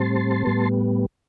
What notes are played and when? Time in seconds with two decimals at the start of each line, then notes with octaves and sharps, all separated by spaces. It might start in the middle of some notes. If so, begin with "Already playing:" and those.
Already playing: A2 G3 C4 A5 C6
0.45 A2 G3 B3